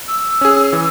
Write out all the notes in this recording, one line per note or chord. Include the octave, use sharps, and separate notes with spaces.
E6
C#4 G#4
E3